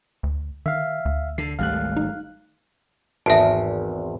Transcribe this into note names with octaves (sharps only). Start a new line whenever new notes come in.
D2
D#3 E5 F5
D2
D3 C7
G#1 G3 A3 F5 F#6
D#4
G#1 E2 E5 A5